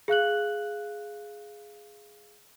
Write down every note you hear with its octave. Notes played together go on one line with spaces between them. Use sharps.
G#4 F5 F#6 F#7